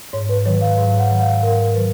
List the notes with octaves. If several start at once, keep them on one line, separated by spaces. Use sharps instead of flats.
G#2 C#5
B4
D#3 F#3 C#5
F5
G#2
F#5
D#3 F#3
F5
G#2 A#4
D#3 F#3 B4